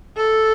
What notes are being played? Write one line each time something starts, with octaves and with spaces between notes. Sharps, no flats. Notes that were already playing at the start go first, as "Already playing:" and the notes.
A4